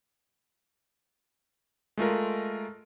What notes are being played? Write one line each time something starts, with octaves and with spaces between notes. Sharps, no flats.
G#3 A3 F4 A#4